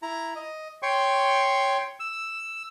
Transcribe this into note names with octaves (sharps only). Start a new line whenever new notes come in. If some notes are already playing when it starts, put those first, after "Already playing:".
E4 A#5
D#5
C#5 G5 C6 C#6
E6